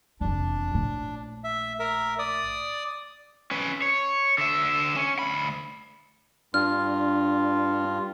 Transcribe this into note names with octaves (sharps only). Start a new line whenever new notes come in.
F1 E2 D4
A#1 A2
E5
A#4 E5
D5 D#6
C#4 B4
C#5
D3 E5
C#4
D2 B5
G2 D4 F4 F6